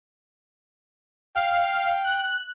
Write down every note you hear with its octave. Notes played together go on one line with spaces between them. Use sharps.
F5 G5
F#6